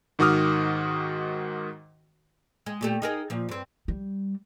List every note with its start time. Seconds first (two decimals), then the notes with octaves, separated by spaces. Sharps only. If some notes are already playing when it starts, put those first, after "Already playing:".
0.19 G#2 D#3 F#4 D6 D#6 F6
2.66 G#3
2.81 A#2 A3 G4
3.02 D#4 G#4 A#4
3.30 A#2 F3
3.49 G2 C4
3.88 G3